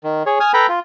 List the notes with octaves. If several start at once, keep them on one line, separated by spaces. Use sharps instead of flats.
D#3
G#4 C#5
G#5 D#6 F6
A4 B4 G5 A#5 B5
F4